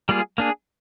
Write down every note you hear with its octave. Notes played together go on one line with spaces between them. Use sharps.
G3 A#3 F4 G#4
A#3 D4 G#4